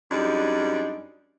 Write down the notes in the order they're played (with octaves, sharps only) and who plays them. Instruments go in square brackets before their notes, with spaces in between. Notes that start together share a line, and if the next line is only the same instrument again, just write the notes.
[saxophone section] F#2 G3 G#3 D4 D#4